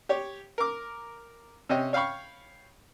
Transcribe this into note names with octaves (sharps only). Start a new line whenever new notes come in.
G4 C#5
A#4 D6
C3 C#4 D#5 G5
C#5 F5 G5 B5 C#6